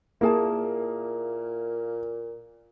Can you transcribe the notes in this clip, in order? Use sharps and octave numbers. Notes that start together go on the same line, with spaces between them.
A#2 A#3 E4 G#4 A5